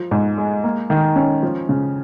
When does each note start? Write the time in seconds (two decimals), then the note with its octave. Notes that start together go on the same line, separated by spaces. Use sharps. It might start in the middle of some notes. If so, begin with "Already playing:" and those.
Already playing: F3
0.11 G#2
0.38 G#3
0.64 A#3
0.90 D#3
1.16 C#4
1.43 F3
1.69 C#3